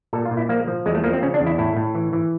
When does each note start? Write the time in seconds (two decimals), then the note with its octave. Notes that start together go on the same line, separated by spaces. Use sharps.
0.13 A#2 A4
0.25 F4
0.31 A#2
0.37 E4
0.49 F3 A#3
0.67 F3
0.86 E2 G#3
0.95 A3
1.04 F3 A#3
1.13 C4
1.22 C#3 C#4
1.34 D4
1.40 E2
1.46 E4
1.58 A2 E4
1.77 A2
1.95 E3
2.13 E3